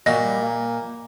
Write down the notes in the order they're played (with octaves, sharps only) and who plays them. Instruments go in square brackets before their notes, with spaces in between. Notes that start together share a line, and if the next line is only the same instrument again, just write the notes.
[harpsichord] A#2 [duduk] F#4 [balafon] D#5
[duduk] G3
A#3